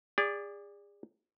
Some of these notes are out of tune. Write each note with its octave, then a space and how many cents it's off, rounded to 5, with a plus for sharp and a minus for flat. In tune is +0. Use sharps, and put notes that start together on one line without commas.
G#4 -35 D5 -5